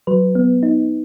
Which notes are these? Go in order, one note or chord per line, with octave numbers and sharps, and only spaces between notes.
F#3 B4
B3
D#4